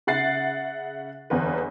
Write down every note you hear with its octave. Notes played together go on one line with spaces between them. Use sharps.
C#3 E5 F#5 A6 C7
G1 E2 B4